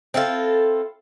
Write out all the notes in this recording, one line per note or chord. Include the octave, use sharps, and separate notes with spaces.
C4 E4 F4 A4